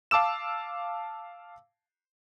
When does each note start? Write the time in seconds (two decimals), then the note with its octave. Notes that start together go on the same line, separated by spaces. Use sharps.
0.11 F5 A5 D6 E6 E7